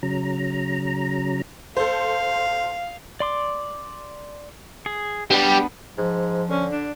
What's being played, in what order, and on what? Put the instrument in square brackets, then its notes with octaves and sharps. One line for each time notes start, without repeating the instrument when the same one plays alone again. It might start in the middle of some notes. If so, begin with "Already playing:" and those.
[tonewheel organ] C#3 F#3 A#5
[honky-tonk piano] A4 C5 [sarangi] F5
[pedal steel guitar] D5 C6 D6
G#4
[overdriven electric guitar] G3 G4 [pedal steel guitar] B3 D4 B4
[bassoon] G#2 [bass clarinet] F3
[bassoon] D3 [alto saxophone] C#4
[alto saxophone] D4